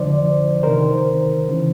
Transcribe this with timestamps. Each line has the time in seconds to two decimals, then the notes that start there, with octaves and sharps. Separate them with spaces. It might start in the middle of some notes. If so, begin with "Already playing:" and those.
Already playing: F2 D3 F3 C5 D5
0.63 D2 C3 D#3 A#4 C5
1.49 C#3 E3